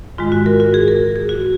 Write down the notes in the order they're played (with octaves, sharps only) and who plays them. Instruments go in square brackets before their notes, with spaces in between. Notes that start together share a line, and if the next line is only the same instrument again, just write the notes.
[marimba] G#2 D#3 G#3 F4
F#4
A#4
F#4
G#4
A#4
G#4
F#4